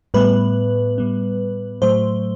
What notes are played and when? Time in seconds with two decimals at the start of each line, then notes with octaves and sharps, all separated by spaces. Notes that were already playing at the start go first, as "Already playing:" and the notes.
0.14 A2 G3 B3 B4
0.98 A2 G3 B3
1.82 A2 F#3 A3 C5